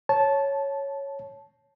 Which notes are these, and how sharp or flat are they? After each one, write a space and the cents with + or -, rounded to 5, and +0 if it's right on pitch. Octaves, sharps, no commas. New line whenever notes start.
C#5 +0 A5 -10